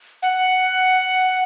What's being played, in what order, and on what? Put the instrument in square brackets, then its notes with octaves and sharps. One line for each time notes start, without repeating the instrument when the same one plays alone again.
[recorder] F#5